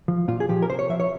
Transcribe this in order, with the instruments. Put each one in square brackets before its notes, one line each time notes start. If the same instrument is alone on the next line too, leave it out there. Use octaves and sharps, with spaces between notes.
[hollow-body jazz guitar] F3
A#2 F4
G#4
F3 G4
A#4
C3 C5
C#5
F3 E5
C#5